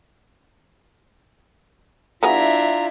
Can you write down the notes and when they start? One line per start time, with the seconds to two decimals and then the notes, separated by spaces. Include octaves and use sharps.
2.23 F#3 B3 D4 E4 F4 G#4 E5 A#5